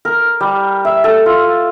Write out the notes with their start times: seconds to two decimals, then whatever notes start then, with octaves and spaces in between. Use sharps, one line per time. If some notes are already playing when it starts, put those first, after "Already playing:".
0.05 A#4
0.40 G3
0.85 E5
1.04 A4
1.26 F4